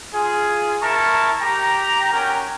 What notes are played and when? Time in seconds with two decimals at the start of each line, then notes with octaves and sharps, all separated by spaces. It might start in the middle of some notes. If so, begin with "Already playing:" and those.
0.14 F4 G#4
0.83 E4 A#4 A5 C#6
1.41 G4 G5 A#5
2.12 C#4 F#4 G4 A#4 G5